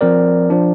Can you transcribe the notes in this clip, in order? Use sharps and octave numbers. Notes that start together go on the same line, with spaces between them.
F3 C4 A#4 D5
F3 D4